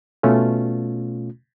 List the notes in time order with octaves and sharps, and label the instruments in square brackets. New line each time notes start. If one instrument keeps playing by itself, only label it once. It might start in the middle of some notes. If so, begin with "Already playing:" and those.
[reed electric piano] B2 A3 C#4 F4